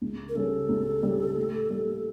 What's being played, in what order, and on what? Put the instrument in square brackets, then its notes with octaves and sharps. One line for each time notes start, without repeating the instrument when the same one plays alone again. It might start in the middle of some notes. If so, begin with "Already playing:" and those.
[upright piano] C#2
[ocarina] A#4
[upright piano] C#3 G3 C#4 [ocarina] A4
[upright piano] C#2
C#3 G3 C#4
A2
G3 A#3